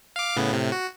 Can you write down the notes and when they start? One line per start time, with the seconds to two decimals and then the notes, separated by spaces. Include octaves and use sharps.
0.16 F5 D6
0.36 A2 C#3 B3
0.53 A2 C3
0.72 F#4